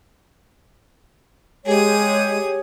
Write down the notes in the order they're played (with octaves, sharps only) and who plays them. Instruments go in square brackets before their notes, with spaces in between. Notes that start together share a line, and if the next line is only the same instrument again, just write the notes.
[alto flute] G#3 [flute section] G4 C#5 [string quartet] G#4 D#6